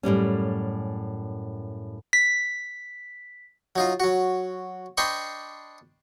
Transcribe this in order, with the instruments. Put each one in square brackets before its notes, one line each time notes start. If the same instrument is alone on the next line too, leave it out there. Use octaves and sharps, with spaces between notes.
[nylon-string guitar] F#2 A2 G3 C#4
[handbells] B6
[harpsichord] F#3 D#4 F4
F#3 F#4
D4 C5 D#5 G5 B5 C#6